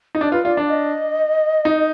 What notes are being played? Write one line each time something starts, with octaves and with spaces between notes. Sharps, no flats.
D#4
D4 D5
F4 B4
F4 D5
D4
D#5
D#4